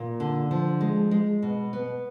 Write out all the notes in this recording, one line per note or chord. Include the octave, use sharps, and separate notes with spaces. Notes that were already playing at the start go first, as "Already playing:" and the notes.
Already playing: A#2
D3
F3
G#3
G#3
B2
B3